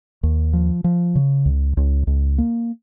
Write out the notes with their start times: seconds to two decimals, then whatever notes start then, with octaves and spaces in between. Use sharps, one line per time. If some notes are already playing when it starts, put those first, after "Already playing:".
0.23 D#2
0.53 F3
0.84 F3
1.15 C#3
1.45 C#2
1.77 C#2
2.07 C#2
2.38 A#3